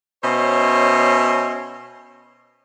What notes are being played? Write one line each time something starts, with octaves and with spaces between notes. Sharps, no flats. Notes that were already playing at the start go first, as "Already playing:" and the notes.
B2 C#4 C5 C#5 D#5 E5